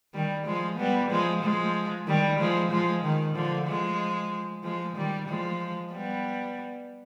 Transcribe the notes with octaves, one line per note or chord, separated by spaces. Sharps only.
D#3 G3
F3 G#3
G3 B3
F3 G#3
F3 G#3
D#3 G3
F3 G#3
F3 G#3
D#3
D3 F3
F3 G#3
F3 G#3
D#3 G3
F3 G#3
G3 B3